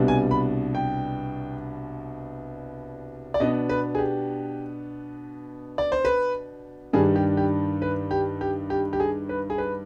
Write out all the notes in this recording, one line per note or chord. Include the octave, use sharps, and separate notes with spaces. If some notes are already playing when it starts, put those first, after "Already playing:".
Already playing: C2 B2 G3 D4
G#5
B5
G5
D5
B2 B3 D4 D#5
B4
G#4
G4
D5
C5
B4
G2 D#3 G3 D4 G#4
G4
G4
B4
G4
G4
G4
G4
G#4
B4
G#4
B4